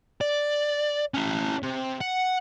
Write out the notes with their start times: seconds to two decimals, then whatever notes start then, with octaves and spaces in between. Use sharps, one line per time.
0.21 D5
1.14 C#4 E4
1.63 C3
2.01 F#5